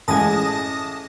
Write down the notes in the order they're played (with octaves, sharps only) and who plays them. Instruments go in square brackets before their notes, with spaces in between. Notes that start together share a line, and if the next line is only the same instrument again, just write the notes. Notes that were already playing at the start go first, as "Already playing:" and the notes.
[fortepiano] A1 G#3 G#5 [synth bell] A5 D#6 A#6